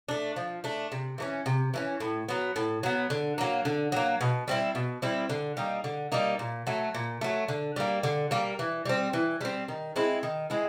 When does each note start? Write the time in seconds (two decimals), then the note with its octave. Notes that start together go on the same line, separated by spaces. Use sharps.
0.08 A3 D4
0.36 F3
0.64 A3 D4
0.92 C3
1.18 E3 A3 C#4
1.46 C3
1.74 E3 A3 C#4
2.00 A2
2.28 F#3 B3
2.56 A2
2.83 F#3 B3
3.10 D3
3.38 F#3 A#3
3.65 D3
3.92 F#3 A#3
4.21 B2
4.48 G3 C4 E4
4.75 B2
5.02 G3 C4 E4
5.30 D3
5.57 G3 A#3 D#4
5.84 D3
6.12 G3 A#3 D#4
6.39 A#2
6.67 F#3 A3
6.95 A#2
7.21 F#3 A3
7.48 D3
7.76 G3 A#3
8.03 D3
8.31 G3 A#3
8.59 E3
8.86 G3 C4
9.13 E3
9.41 G3 C4
9.68 D#3
9.96 G#3 C4 E4
10.23 D#3
10.50 G#3 C4 E4